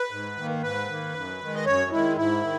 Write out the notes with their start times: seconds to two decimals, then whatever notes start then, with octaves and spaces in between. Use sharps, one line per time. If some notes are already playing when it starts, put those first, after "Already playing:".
Already playing: B4
0.11 G#2
0.37 D#3 A#3
0.63 G#2 B4
0.88 D#3 A#3
1.14 F#2
1.40 D#3 G#3
1.54 D#5
1.65 F#2 C#5
1.91 D#3 G#3 E4
2.17 G#2 E4
2.43 D#3